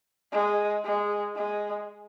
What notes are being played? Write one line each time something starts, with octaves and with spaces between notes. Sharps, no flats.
G#3
G#3
G#3